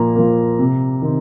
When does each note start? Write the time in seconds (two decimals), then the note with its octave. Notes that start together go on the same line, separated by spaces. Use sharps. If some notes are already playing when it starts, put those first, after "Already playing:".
Already playing: A#2 F3 A#3 A#5
0.15 F3 A#3
0.59 C3
1.02 D#3 C4